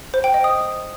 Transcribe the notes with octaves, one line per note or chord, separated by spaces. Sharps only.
C5
G5
D#5
D#6